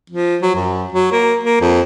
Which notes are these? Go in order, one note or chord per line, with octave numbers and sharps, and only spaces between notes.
F3
F#3
F#2
F#3
A#3
A#3
F2